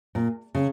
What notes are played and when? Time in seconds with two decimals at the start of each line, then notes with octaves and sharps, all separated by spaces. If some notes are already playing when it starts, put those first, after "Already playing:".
0.15 A#2
0.55 C#3